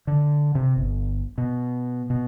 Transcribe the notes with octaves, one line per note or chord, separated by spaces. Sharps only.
D3
C3
G1
B2
B2